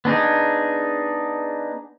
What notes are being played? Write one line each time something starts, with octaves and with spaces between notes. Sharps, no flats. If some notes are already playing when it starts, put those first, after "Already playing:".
B3 D4 D#4 G#4